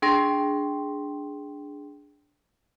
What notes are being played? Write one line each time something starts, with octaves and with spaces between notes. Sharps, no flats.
D4 G#4 G5 C6 A#6